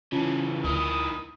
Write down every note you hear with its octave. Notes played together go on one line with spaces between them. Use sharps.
C#3 E3 C#4 F4 A5
D2 D#3 E4 D#6